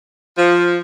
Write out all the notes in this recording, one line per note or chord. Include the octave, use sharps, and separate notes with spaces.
F3